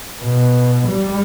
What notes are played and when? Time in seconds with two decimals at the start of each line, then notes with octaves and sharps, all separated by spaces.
0.23 B2
0.88 G3